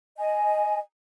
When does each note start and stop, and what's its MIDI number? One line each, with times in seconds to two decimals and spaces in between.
0.17 0.79 75
0.17 0.79 80